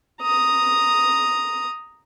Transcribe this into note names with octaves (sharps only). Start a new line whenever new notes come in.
A#5 D#6